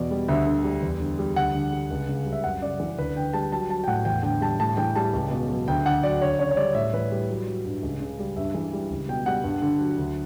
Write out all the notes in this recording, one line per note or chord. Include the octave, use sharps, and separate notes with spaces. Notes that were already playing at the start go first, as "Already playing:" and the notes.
Already playing: E2 B2 D5
G3
D2 E5
D3
G3
E2
D3
G3
D2 F#5
D3
G3
C#2
C#3
G3
E5
F#2 F#5
C#3 D5
E3
D2 B4
D3 G5
G3 A5
F#3 A5
F#3 A5
G5
A2 F#5
E2 G5
D3 G5
G3 A5
A2 A5
E3 G5
G3 A5
C#2
B2
F#3
D2 G5
D3 F#5
F#3 D5
D2 C#5
C#3 C#5
C#5
G3 D5
A2 E5
E3 B4
G3
F#3
F#3
G2
C#2
C#3
G3
G2 E5
E3
G3
C#2
B2 G5
G3 F#5
G2
D3
F#3
D2